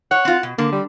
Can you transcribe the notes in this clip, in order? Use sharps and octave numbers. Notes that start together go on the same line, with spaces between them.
C#5 F#5
C4 F4
B2
D3 A#3
G3